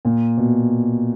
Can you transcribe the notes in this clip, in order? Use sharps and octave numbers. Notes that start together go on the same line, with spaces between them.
A#2
B2